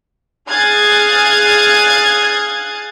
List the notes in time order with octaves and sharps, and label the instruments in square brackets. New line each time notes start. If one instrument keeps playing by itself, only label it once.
[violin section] G#4 F5 D#6 F#6 G#6 A6